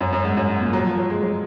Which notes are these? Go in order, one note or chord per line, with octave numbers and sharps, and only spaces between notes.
F#2
F#2
G#2
F#2
A#2
F#3
F3
F#3
G#3
F#3